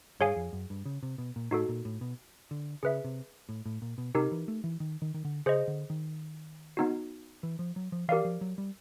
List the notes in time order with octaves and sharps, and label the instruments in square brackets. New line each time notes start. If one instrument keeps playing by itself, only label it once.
[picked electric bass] G2 [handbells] G#4 C#5 F5 G#5
[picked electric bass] F2
F#2
G2
C#3
C3
B2
A#2
[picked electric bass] A2 [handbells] D#4 F#4 A4
[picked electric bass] A#2
A2
B2
D3
[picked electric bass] C#3 [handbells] G#4 B4 E5
[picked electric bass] C3
A2
A2
A#2
B2
[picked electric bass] C3 [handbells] D#4 G4 A#4
[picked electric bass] E3
A3
E3
D#3
D#3
D#3
D3
[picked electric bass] C#3 [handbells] G#4 C5 D#5
[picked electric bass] D3
D#3
[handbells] B3 D#4 F#4
[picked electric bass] E3
F3
F#3
F3
[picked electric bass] E3 [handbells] G4 A#4 D5 F5
[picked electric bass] F3
F#3
G3